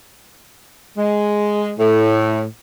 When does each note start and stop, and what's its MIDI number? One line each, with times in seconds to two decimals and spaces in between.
0.98 1.72 56
1.79 2.44 45